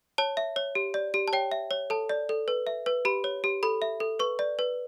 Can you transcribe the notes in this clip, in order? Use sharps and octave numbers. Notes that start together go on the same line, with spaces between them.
C#5 A5
E5
C#5
G4
D5
G4
A5
C#5 G5
E5
C#5
A4 A5
D5
A4
B4
E5
B4
G4 B5
C#5
G4
A4 B5
E5
A4
B4 C#6
D5
B4